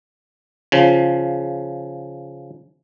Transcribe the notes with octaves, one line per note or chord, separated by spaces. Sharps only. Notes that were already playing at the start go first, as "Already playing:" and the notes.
C#3 F3